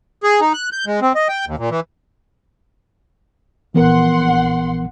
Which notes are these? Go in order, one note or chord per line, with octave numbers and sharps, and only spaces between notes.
G#4
D#4
F#6
G6
G#3
C4
D#5
G5
D#2
A#2
E3
A#1 E3 B3 A#4 F#5 C6